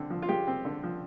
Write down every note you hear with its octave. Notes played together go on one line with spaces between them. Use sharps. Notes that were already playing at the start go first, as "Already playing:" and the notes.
Already playing: D3 C4
F3
F4
G#3 G4
C4
D3
F3